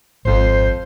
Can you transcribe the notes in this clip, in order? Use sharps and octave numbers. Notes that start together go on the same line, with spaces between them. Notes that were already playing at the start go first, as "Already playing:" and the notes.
G#1 F2 C5